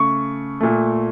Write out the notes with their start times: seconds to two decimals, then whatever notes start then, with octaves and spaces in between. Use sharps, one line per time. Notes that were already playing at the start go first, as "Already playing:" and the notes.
Already playing: C#3 A3 C#6
0.61 A#2 A3